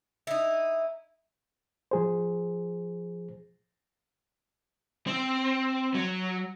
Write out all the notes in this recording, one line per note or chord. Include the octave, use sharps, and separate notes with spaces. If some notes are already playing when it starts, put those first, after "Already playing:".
D#4 E4
F3 G#4 C5
C4
F#3